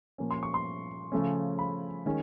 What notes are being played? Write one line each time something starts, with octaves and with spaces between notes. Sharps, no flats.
A#2 F3 A#3 C#4
C6
C#6
C6
C#3 F3 A3 C#4
B5
D#3 G#3 C#4